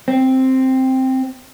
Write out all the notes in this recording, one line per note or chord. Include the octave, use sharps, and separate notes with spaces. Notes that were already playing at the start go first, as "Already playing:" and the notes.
C4